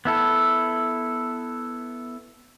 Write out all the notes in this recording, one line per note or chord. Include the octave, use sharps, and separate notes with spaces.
B3 E4 A4